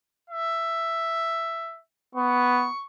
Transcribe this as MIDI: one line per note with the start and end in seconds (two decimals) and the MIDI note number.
0.30 1.80 76
2.15 2.68 59
2.15 2.87 85